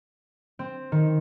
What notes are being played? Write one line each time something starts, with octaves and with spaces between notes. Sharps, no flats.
C4
D#3